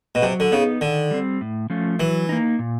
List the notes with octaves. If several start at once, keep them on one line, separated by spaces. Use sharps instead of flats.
B2
C3 F#3
D3
C#3 B3 D#4
D3 D#3
G3 C4
A2
F3 A3 C#4 F4
E3 F#3
A#3 D#4
A#2